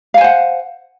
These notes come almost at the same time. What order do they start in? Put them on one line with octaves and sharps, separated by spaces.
F5 G#5 C5 F#5